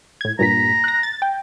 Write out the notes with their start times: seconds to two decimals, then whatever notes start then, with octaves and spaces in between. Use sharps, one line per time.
0.21 A2 G#6
0.39 G2 A#2 A#5 B6
0.84 F#6 A#6
1.03 A6
1.22 G5